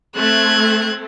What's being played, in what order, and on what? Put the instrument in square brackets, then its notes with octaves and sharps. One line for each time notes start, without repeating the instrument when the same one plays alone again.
[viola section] A3 C4 [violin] F#6 G#6